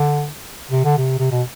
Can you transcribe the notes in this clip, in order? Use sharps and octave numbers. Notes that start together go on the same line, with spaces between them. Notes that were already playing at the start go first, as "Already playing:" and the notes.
Already playing: D3
C3
D3
C3
C3
B2